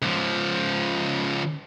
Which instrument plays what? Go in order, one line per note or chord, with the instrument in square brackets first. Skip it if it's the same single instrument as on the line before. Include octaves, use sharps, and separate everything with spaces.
[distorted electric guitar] C#2 F3